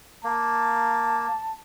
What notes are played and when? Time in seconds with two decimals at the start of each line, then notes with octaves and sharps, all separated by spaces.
0.24 A#3 A5